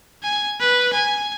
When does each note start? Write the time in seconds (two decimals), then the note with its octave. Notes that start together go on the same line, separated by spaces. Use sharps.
0.23 G#5
0.60 B4
0.93 G#5